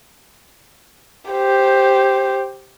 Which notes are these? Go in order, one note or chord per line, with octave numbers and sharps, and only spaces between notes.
G4 C5